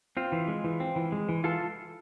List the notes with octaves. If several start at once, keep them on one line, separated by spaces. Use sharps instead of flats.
C4 F4
E3
G#3
E3
C4
E3
G#3
E3
E3 F4 A4